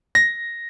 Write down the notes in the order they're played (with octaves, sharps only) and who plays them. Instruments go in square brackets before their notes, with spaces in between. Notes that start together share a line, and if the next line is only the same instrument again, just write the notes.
[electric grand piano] A#6